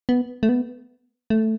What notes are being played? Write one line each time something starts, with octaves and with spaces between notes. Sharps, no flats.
B3
A3
B3
A3